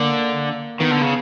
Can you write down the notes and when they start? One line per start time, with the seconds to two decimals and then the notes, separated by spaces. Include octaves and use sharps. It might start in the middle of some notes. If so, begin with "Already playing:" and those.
Already playing: D3 A#3
0.80 D#3 B3
0.91 D3
1.02 C#3